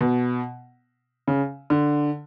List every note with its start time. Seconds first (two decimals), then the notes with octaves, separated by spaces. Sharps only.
0.01 B2
1.28 C#3
1.70 D3